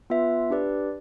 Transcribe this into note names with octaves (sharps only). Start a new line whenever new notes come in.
B3 F4 B4 E5
D4 G4 B4 D5